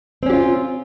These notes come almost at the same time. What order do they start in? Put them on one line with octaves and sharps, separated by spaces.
C4 C#4 G4 F4